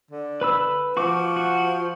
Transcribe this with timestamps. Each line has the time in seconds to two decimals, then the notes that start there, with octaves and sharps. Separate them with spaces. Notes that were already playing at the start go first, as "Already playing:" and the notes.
0.11 D3
0.41 B4 B5 E6
0.97 F3 F#4 C#6 D6
1.36 F#4